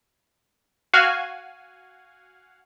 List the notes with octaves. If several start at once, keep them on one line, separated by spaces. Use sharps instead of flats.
F#4 F5 F#5 G#5